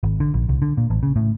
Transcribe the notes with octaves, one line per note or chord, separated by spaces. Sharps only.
G#1
D3
A#1
C2
D3
A#2
A1
C#3
A2